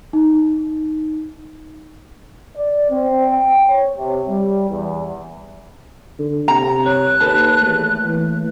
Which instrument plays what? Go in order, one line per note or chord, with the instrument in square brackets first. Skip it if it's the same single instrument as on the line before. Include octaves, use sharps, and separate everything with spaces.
[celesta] D#4
[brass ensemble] D5
C4
G5
C#5
C3
G3
E2
[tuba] D3
[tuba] C3 [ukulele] A#5
[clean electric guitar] C2 G2 C#5 [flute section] F#6
[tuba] D#2 [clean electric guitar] A4 B4 A5
[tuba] E2 [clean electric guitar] A#2 A3
[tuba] E3